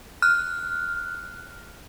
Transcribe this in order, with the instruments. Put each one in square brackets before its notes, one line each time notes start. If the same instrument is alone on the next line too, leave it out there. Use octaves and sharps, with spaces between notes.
[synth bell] F6 F#6